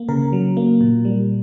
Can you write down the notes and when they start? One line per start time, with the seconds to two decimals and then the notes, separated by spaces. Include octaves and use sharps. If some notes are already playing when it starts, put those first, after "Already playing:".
Already playing: A#3
0.09 C#3 A#4
0.33 F#3
0.57 A#3
0.81 A#2
1.05 G3